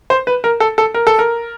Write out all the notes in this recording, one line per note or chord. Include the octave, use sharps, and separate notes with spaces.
C5
B4
A#4
A4
A4
A#4
A4
A#4